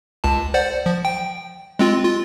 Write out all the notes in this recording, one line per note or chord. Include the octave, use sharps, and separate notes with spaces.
C#2 A5
C5 D5 F#5
F3
G5
G#3 C4 F4
F4